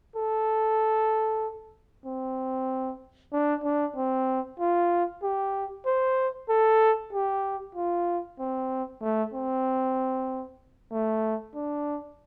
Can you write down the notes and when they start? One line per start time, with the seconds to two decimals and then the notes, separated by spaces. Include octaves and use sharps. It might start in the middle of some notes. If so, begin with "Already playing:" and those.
0.16 A4
2.05 C4
3.32 D4
3.64 D4
3.96 C4
4.59 F4
5.23 G4
5.86 C5
6.49 A4
7.13 G4
7.75 F4
8.39 C4
9.02 A3
9.34 C4
10.91 A3
11.55 D4